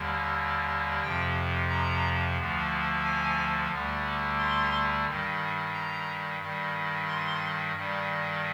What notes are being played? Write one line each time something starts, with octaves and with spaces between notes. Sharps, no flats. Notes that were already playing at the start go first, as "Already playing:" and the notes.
Already playing: D#2 D3 G3
F2 C3 F3 G5
A#5
D2 D3 F3
G#5
D2 D3 G3
C6
G2 D#3 G3
A#5
G2 D#3 G3
C6
G2 D#3 G3